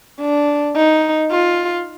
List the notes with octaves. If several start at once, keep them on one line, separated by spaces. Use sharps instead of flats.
D4
D#4
F4